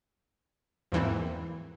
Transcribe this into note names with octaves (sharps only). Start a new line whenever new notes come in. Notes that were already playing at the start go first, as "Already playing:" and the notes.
E2 G#2 E3 A#3 C4